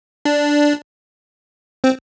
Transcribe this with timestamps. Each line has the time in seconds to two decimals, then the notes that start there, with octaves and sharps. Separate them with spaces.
0.25 D4
1.84 C4